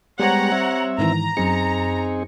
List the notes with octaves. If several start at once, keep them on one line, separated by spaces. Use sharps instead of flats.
G3 G#3 B3 G4 C5 C#5 F#5 A#5
C4 E5
G#2 D#3 E3 A#5
F#2 C4 D#4 G#4 C#7